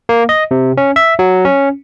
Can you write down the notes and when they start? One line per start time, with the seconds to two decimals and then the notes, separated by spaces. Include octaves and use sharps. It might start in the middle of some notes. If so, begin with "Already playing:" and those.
0.09 A#3
0.29 D#5
0.51 C3
0.77 C#4
0.96 E5
1.19 F#3
1.45 C#4